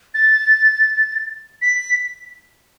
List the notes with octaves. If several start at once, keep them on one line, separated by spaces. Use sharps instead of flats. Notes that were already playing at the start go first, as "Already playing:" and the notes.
A6
B6